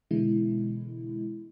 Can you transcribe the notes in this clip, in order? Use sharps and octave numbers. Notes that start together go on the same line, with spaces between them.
B2 D3 E3 G#3 E4